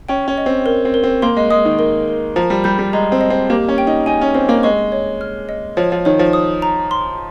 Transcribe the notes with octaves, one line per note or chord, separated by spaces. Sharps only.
C#4 G5
C#4
D#5
C4
A#4
C4
A#4
C4
A#3 C6
G#3
G#3 D#6
D#3
A#4
A#4
F3 A#5
G3
G3 G6
G3
G#3 A#5
C4
D#5
C4
A#3 G4
C#4
G5
D#4
D#4 G#5
C#4
C4 D#5
A#3
G#3 C#6
C#5
F6
D#5
F3 C#5
F3
D#3 C#5
F3
D#6
A#5
C6